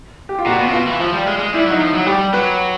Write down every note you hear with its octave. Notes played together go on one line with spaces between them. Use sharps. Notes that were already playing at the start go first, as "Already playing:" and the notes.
G4
F4
A#2 F#4
B2
C3
B2 F4
E3
F3 F4
G3
G#3
G3
G#3
G3 E4
F#3
D#4
F3
F#3
G3 G4
F#3 B4